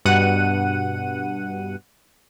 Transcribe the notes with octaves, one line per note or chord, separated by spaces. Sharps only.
G2 B2 F#5 D#7